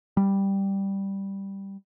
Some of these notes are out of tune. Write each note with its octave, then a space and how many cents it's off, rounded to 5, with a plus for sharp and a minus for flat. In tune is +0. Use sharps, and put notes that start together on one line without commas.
G3 +0